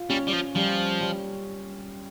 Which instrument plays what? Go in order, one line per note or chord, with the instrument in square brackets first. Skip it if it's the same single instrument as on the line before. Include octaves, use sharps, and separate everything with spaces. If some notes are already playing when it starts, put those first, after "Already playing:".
Already playing: [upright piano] F4
[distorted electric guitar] G3 [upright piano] C#4
[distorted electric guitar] G3
F3
[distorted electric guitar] F3 [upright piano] G3
[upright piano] G3